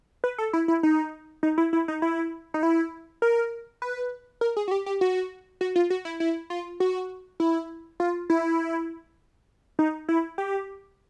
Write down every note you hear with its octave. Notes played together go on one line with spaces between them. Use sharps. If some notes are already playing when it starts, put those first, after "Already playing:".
B4
A4
E4
E4
D#4
D#4
E4
E4
D#4
E4
D#4
E4
A#4
B4
A#4
G#4
F#4
G4
G4
F#4
F#4
F4
F#4
E4
E4
F4
F#4
E4
F4
E4
D#4
E4
G4